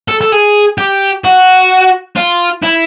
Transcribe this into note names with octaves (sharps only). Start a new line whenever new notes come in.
A4
A4
G#4
G4
F#4
F4
E4